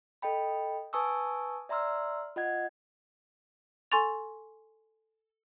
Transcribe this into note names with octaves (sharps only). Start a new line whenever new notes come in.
A4 D#5 G5 B5
B4 G#5 A5 C#6 D#6 E6
D5 E5 A#5 C6 E6 F6
F4 D#5 F#5 G#6
A4 G#5 C6 C#6 A6 F7